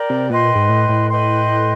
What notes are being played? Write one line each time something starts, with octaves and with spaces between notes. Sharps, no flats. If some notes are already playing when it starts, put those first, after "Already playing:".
Already playing: A#4 D5 G5
C3
A#2 B4 D#5 G5 C6
G#2
A2
A2
B4 D#5 G5 C6